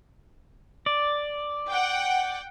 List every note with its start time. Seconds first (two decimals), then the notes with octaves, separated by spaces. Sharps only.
0.86 D5
1.70 F#5 G5